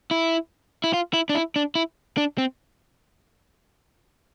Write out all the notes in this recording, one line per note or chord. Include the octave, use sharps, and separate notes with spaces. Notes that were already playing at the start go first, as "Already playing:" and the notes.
E4
E4
F4
E4
D4
E4
D4
E4
D4
C4